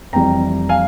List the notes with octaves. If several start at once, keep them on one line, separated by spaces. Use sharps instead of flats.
F1 F2 C3 E3 G3 G5 A#5
F5 G#5